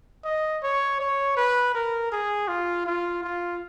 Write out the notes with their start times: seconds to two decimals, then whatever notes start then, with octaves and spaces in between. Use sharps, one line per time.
0.24 D#5
0.63 C#5
1.00 C#5
1.37 B4
1.74 A#4
2.12 G#4
2.48 F4
2.86 F4
3.23 F4